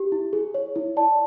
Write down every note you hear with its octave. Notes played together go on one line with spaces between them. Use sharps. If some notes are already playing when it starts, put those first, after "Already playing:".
Already playing: G4
E4
G#4
C#5
E4
D5 A5